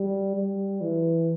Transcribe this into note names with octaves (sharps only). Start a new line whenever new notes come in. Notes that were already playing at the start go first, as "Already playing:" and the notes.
Already playing: G3
G3
E3